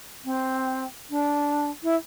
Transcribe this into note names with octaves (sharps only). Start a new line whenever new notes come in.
C4
D4
E4